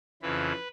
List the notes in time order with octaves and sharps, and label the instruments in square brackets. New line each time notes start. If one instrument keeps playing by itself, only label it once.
[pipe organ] F2 C#3 E3 B4